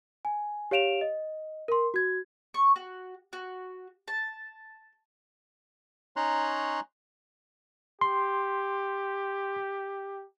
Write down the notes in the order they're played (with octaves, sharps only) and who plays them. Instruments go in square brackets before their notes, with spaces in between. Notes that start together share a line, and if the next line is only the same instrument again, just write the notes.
[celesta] G#5
G4 C#5 F5 D7 E7 F7
D#5
A#4 C6
F#4 G#6
[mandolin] C#6
F#4
F#4
A5
[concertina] C#4 D#4 C#5 A#5 C6 F#6
[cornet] G4 [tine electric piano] C6